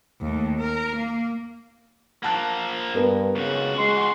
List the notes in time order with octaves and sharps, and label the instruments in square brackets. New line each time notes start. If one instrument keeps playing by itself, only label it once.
[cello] D#2 A3
A#4
A#3
[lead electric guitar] F3 A#3 [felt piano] F#5 A5 F#6
[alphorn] G2 [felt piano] B3 A#4
[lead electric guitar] C#2 F#4 [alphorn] C#3
[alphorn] G#3 [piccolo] C6